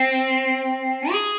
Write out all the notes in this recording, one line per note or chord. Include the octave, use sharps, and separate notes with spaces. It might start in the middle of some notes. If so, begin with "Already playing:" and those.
Already playing: C4
G#4